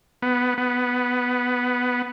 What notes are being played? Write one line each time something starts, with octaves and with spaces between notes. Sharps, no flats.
B3
B3